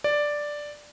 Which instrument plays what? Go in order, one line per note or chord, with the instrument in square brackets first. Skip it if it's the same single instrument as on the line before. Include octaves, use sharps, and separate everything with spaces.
[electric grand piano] D5